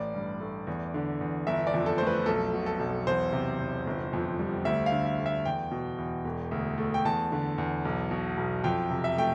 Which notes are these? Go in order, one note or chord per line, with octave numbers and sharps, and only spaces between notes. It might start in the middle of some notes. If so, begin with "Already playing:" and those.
Already playing: A1 D5
G2
A3
E2
D3
E2
G1 E5
D5
F2
A4
A3 C5
B4
B1 A4
B2
A4
B1
E2 C5
C3
E2
G1
F2
G3
D2 E5
F5
D3
E5
A3
E5
E2 G5
B2
E2
E1
D2
A3
G5
E2 A5
D3
E2
B1
B2
B1
F2 G5
C3
E5
A3 G5